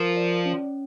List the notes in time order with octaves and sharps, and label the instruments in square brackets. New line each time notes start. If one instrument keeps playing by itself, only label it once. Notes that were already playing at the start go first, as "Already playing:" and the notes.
Already playing: [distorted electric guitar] F3 [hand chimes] A#4
[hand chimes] D5
C#4